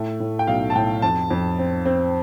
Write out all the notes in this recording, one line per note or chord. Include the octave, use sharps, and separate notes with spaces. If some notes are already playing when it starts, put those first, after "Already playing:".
Already playing: A2 A3
A2
G5
B1 F5
A5
A2 G5
F2 A5
F2
C4
C4